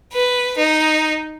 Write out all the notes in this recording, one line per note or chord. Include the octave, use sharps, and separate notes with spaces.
B4
D#4